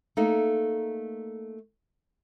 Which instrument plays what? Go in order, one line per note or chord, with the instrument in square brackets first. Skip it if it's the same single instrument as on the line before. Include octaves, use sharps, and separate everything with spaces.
[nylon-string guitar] A3 A#3 D#4